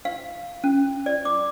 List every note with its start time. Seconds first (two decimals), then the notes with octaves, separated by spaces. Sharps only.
0.05 F5
0.64 C#4
1.06 D5
1.25 D6